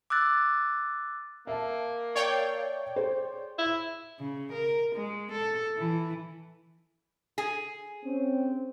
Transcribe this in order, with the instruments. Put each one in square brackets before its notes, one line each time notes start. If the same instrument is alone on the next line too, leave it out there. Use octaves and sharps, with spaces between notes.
[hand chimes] D6 E6 F#6 A6
[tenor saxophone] A#3 [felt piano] E5 A5
[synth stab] C#5 D5 G5
[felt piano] G#4 C5
[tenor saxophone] E4
[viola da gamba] C#3
A#4
G#3
A4
E3
[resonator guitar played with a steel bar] G#4
[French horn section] C4 C#4